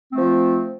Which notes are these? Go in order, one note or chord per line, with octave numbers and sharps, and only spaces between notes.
F3 A3 C4